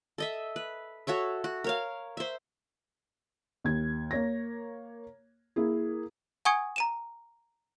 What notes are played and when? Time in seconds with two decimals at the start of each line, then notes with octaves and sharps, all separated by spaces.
0.18 A4 D#5 E5
0.56 B4
1.07 F#4 A4 C#5 E5
1.44 F#4
1.64 A#4 C#5 F5
2.17 C5 E5
3.64 D#2 G#6
4.11 A#3 C#5 A#6
5.56 A#3 E4 G#4
6.45 F#5 G#5 C#6 D#6 G#6 C#7
6.76 A#5 D#7 E7